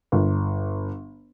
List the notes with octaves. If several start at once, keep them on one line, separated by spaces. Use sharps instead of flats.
G1